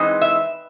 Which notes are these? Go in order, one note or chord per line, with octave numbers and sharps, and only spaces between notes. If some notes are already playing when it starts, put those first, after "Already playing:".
Already playing: E3 G#3 C4 D#4
E5